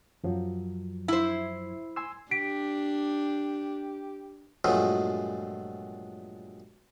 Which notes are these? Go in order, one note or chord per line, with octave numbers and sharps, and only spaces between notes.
F#2 F3 F#3
E4 C5
G#5 C6 E6
D4 G4 B6 D7
G2 A#2 F3 F#3 G#3 A3